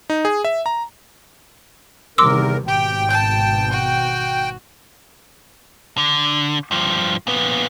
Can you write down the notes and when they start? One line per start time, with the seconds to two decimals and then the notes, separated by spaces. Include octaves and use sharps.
0.10 D#4
0.25 G#4
0.44 E5
0.66 A#5
2.18 E2 C3 D#3 G3 A#4 C6 D6 E6
2.68 G#1 B2 G4 G5
3.11 A5 G6
3.71 F#4
5.98 D3
6.71 G2 F3
7.27 A#2 B3